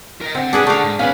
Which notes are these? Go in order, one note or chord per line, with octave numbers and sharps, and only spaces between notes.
A#4 D#5
D3 C4 F#5
D4 G#4 B4
A3 D4 F5
G#2
D#3 B3 C#4 B4 F5